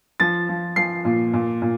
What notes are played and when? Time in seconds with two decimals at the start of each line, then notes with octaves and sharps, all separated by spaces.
0.20 F3 A6
0.49 F3
0.76 F3 C7
1.05 A#2
1.34 A#2
1.62 A#2